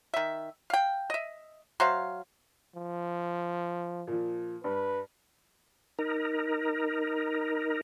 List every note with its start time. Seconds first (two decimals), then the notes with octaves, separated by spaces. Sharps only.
0.14 D#3 E5
0.70 F5 G5
1.10 D#5 E5
1.80 F#3 C5 E5 F5
2.76 F3
4.07 A#2 F3
4.64 G2 B4
5.99 D#4 A#4